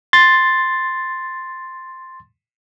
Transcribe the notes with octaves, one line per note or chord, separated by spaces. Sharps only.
C6 A6